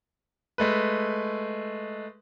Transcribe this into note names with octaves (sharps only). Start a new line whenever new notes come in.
G#3 A3 B4